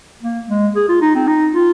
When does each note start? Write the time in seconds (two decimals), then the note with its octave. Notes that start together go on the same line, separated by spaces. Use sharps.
0.22 A#3
0.48 G#3
0.76 G#4
0.89 F4
1.01 D#4
1.15 C4
1.28 D#4
1.54 F4